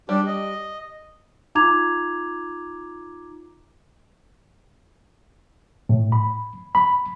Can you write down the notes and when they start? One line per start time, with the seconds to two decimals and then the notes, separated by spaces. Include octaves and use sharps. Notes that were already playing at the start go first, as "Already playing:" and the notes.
0.09 G3 D4 G4
0.26 D#5
1.55 D#4 F4 A#5 D6 G#6 F7
5.89 A2
6.12 B5
6.75 B5